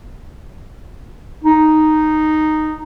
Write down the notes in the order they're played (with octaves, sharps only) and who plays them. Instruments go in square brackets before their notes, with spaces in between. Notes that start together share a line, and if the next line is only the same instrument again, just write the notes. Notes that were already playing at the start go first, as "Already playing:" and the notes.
[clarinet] D#4